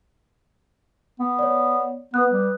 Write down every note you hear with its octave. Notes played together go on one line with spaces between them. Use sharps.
B3
C#5 D5
B3 B4 D#6 F#6
G3